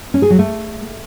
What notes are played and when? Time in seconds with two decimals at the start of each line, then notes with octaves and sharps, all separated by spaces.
0.14 C#4
0.22 G#4
0.30 F#3
0.39 A3